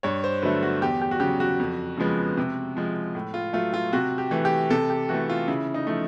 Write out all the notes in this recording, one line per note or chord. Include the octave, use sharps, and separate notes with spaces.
G2 C#5
C5
D3 F#3 A3 B4
F#4
E2 G4
G4
F#4
C#3 F#3 G4
F#4
F2
C#3 F3 G#3 B3
C3
F3 G#3
A2
F4
F#3 A3 F4
F4
C3 F#4
G4
E3 A3
G4
C3 A4
G4
E3 A3 F#4
F4
C#3 E4
D#4
F3 A3